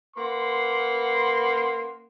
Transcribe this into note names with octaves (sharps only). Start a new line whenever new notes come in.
A#3 C#4 B4 F#5 C6